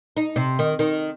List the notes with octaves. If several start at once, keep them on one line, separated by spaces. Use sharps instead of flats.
D#4
C3
D#3
D#3